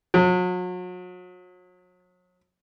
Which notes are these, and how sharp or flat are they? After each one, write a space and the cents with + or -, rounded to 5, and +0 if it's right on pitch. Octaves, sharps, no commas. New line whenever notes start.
F#3 -35